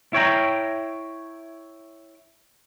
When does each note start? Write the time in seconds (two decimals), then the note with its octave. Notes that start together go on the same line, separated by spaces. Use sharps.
0.13 E4 C#5 G5 A#5